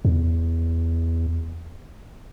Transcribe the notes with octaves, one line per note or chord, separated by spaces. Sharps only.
E2